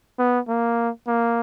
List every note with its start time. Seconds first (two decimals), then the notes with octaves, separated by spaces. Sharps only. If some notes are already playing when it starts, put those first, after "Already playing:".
0.19 B3
0.48 A#3
1.08 A#3